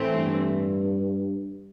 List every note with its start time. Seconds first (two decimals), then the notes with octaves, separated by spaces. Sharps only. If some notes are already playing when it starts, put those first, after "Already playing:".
Already playing: A2 E3 A3 C4
0.15 G2